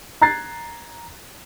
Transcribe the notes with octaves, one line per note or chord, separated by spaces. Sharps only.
A#5 F#6 G#6 A6 C7